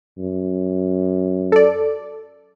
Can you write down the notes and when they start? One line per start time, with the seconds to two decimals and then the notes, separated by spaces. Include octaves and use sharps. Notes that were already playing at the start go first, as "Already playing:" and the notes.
0.18 F#2
1.52 A4 D5